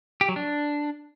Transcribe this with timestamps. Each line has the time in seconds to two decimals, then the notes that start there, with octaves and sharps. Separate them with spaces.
0.21 G4
0.29 F#3
0.36 D4